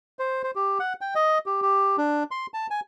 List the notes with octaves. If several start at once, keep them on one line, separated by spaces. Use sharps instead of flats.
C5
C5
G4
F#5
G5
D#5
G4
G4
D4
C6
A5
G#5